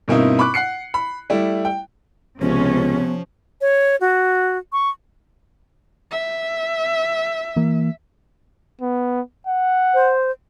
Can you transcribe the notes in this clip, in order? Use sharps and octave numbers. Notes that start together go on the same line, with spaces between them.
G2 B2 A#3 C4 D#4 E4
B5 C#6 D6 F#6
F#5 F#6 C7 C#7
B5
G3 A3 E4
G5
C#2 C3 F3 B3 C#4
C#5
F#4
C#6
E5
E3 A#3
B3
F#5
C5